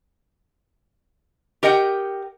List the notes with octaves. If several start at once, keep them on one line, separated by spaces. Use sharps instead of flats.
G4 A#4 D#5 F#5 G5